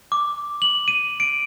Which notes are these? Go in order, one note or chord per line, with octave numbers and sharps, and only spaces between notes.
D6
F#7
D#7
D7